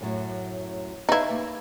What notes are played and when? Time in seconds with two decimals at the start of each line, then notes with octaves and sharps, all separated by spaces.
0.01 F#2 A2 F#3
1.09 D#4 E4 B4 F5
1.30 A#3